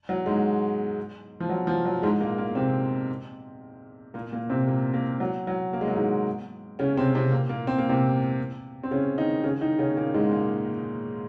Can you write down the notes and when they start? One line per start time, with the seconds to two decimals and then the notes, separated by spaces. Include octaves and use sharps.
0.09 F#3
0.26 G#2 G#3
1.40 F3
1.49 F#3
1.67 F3
1.86 F#3
2.02 G#2 G#3
2.21 A#2 A#3
2.38 A#2 A#3
2.55 C3 C4
4.14 A#2 A#3
4.32 A#2 A#3
4.50 C3 C4
4.68 A#2 A#3
4.94 A#2 A#3
5.20 F#3
5.47 F#3
5.73 A#3
5.81 G#3
5.88 F#3
5.95 G#2 G#3
6.79 C#3 C#4
6.97 C3 C4
7.14 C3 C4
7.32 A#2 A#3
7.49 A#2 A#3
7.67 C4
7.78 A#3
7.89 C3 C4
8.84 C4
8.91 C#3 C#4
9.18 D#3 D#4
9.43 C#3 C#4
9.61 D#3 D#4
9.79 C#3 C#4
9.96 A#2 A#3
10.14 G#2 G#3
10.32 A#2 A#3